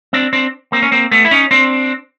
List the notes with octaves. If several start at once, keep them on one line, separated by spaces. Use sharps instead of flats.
C4 D4
C4 D4
A#3 C4
C#4
A#3 C4
A3 B3
E4
C#4 D#4
C4 D4